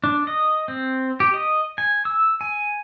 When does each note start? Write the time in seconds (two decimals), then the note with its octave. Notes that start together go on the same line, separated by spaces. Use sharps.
0.04 D4
0.27 D#5
0.68 C4
1.20 G4
1.34 D#5
1.78 G#5
2.05 E6
2.41 G#5